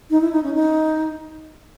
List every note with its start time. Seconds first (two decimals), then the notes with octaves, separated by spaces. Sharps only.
0.10 D#4
0.21 E4
0.32 D#4
0.43 C#4
0.54 D#4